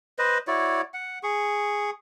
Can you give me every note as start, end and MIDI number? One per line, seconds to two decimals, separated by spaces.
0.19 0.38 71
0.19 0.38 72
0.19 0.38 75
0.47 0.81 64
0.47 0.81 66
0.47 0.81 73
0.47 0.81 74
0.94 1.19 78
1.23 1.90 68
1.23 1.90 85